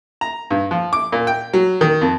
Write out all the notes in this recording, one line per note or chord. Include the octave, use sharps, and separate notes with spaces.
A#5
G2
F3
D6
A#2
G5
F#3
D#3
F2